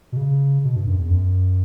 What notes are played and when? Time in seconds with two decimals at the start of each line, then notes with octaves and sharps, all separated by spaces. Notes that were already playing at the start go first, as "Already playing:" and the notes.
0.12 B2
0.17 C#3
0.64 B2
0.76 G2
0.87 F#2
0.99 E2
1.10 F#2